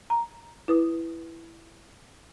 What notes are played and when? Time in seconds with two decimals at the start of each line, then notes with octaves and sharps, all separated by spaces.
0.10 A#5
0.68 E4 B4 D#6